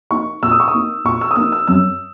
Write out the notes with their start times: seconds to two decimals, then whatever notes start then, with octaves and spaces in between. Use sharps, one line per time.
0.11 A#3 D#4 C#6
0.43 A#2 E6
0.51 D#6
0.60 C#6
0.68 D#6
0.74 A#3 D#4
1.05 A#2 C#6
1.21 E6
1.31 D#6
1.36 A#3 D#4 E6
1.52 E6
1.67 F#2 E6